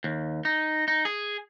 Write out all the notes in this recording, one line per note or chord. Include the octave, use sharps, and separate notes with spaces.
D#2
D#4
D#4
G#4